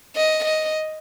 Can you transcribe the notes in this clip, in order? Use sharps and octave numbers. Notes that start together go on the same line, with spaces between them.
D#5
D#5